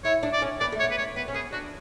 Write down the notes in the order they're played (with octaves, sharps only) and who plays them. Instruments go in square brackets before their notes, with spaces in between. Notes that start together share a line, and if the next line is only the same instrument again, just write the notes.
[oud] E4 [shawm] C#5
[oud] D4
[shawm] D5
[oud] C#4
[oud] B3 [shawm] D5
[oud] A3
[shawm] C#5
[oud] B3
[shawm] B4
C#5
[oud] B3 [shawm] B4
[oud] C#4
[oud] B3 [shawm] G#4
[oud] D4 [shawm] F#4